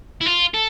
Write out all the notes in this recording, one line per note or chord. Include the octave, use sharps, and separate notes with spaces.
E4
F4
A4